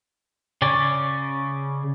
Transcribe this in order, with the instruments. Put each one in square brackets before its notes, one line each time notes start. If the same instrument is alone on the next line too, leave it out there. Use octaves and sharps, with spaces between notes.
[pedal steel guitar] C#3 C#4 D5